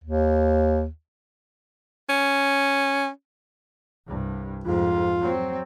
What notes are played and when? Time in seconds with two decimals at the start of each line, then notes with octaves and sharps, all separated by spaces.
0.04 D#2
2.09 C#4
4.07 C2 G2
4.64 F2 G#2 F4
5.20 F#3 C4